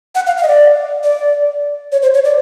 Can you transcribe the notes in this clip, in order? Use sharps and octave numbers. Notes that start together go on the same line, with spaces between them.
F#5
F5
F5
D#5
D5
D5
C#5
C5
C#5
D5